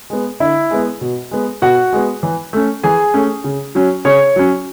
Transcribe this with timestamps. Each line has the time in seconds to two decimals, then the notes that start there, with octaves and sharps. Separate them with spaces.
0.10 G#3 B3
0.40 D3 E4 E5
0.71 G#3 B3
1.01 B2
1.31 G#3 B3
1.62 B2 F#4 F#5
1.93 G#3 B3
2.23 E3
2.53 A3 C#4
2.83 E3 G#4 G#5
3.14 A3 C#4
3.44 C#3
3.75 F#3 C#4
4.05 C#3 C#5 C#6
4.36 F#3 C#4